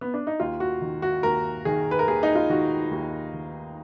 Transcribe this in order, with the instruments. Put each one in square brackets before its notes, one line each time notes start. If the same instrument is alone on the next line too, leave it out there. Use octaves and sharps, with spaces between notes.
[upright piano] B3
D4
D#4
D#2 F4
F#4
D#3
F#4
D#2 A#4
D#3 G#4
B4
A#4
D#2 G#4
D#4
F4
D#3 F#4
D#2
D#3